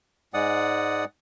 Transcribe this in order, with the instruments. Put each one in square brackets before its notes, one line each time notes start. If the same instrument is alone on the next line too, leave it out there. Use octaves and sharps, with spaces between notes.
[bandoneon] G#2 G#3 D5 F#5 D#6